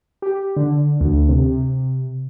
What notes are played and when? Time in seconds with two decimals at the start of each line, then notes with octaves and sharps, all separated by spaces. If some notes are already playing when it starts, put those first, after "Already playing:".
0.22 G4
0.56 D3
1.01 D2
1.29 C3